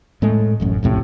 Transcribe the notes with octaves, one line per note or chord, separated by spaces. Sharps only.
A2 G#3 A3
D#1 A1 F#2
B1 F2 A2 C3